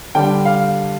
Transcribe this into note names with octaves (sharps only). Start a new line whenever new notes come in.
D3 G3 D4 G5
F5